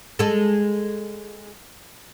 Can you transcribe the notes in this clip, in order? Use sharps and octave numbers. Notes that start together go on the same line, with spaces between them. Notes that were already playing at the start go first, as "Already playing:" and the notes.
G#3 A4